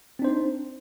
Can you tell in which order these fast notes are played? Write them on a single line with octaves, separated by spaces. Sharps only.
C4 D4 C5 D#4